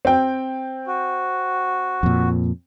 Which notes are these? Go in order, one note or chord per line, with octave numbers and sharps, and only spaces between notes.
C4 G5
F#4
F2 A#2